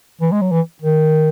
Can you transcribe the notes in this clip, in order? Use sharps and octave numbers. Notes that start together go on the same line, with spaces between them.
E3
G#3
F#3
E3
D#3